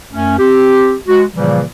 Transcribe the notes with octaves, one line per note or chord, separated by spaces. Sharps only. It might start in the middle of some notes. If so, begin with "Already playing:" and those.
F#2 A3 C#4
C4 G4
G#3 F#4
A#2 C#3 E3 F3 G3 A#3